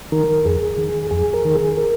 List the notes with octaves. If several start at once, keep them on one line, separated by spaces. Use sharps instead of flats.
D#3 A#4
F2 G#4
D#3
F2 G#4
A#4
D#3
G#4
A#4